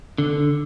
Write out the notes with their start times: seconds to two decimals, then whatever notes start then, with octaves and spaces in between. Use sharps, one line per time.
0.18 D3